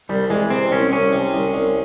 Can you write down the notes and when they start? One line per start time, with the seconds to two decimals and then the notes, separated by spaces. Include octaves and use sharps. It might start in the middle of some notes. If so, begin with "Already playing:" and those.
0.10 C2 G3
0.30 E3 G#3
0.50 C3 C4
0.71 C2 C#4
0.92 C2 C#4
1.12 C3
1.34 C2
1.54 C2